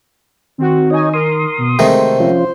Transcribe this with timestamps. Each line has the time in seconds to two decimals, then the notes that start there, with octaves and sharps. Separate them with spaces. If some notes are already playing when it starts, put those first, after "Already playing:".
0.58 D#3 C4 F#4
0.90 D#4 C#5 D#5 G#5
1.13 A#4 C6 D#6
1.58 B2
1.79 C3 D#3 G#3 A3 C5
2.20 F3 C#4 F4